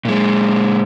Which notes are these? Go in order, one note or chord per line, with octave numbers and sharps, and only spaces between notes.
A#2 G#3